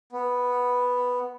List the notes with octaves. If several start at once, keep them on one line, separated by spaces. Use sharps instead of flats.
B3